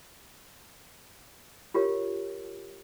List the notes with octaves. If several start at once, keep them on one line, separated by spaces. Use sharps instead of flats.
F4 G4 A#4 C#5